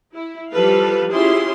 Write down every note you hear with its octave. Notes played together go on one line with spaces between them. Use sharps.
E4
F3 G3 A4 B4 F5
C#4 E4 F4 G4 G#4 C6